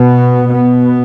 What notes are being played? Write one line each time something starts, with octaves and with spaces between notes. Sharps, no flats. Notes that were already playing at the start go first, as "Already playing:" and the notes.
Already playing: B2 B3
B2 B3